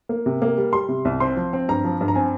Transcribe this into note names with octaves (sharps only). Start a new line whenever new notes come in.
A#3
C3
A#3
G3
G3 C6
C3
C2
C4 C6
F3
C4
G2 A#5
F3
G2
A#5
C4 G#5